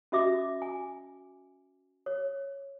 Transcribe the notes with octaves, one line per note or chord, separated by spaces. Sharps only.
C#4 F#4 D#5 E5 D6
G#5
C#5